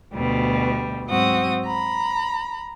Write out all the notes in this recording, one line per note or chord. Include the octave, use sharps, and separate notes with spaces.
D2 B2 G3
G#2 F#3 C4 F#4 D#6
A#5 B5